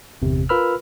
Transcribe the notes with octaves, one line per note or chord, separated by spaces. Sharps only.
G1 E2 C3
F4 A#4 B4 B5 E6 F6